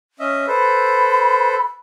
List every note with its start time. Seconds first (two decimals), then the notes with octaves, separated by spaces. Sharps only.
0.20 C#4 D#5 E5
0.47 A4 B4 C5 B5